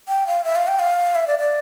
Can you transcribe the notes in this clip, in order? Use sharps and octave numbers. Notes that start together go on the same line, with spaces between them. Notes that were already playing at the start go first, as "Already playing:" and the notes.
G5
F5
E5
F5
G5
F5
E5
D5
D5